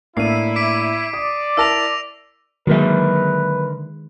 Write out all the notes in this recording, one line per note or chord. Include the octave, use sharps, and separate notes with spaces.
A2 A#3 D4 E4 C7 D#7
D6 B6 D7
D5 D#6
E4 A#4 A5 E6 A#6 F7
D3 D#3 F#3 G#3 A#3 A#4 B4 E5